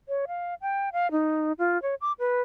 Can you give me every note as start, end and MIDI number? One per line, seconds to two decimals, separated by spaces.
0.09 0.25 73
0.28 0.54 77
0.61 0.89 79
0.93 1.11 77
1.11 1.52 63
1.58 1.80 65
1.82 1.95 73
2.01 2.12 86
2.19 2.42 71